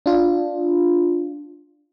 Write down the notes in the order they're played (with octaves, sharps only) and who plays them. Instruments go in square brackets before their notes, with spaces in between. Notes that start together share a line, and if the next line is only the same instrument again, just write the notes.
[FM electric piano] D4 F4